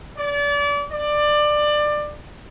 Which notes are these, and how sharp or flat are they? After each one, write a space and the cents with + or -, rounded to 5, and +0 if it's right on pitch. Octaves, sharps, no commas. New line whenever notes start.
D5 -30
D5 +20